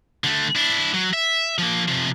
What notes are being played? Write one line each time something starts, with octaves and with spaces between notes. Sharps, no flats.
D3 A3
D4 E4
F#3
E5
F3 A#3
C3 F3